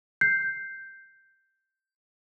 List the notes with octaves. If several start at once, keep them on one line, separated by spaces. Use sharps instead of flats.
G6 C7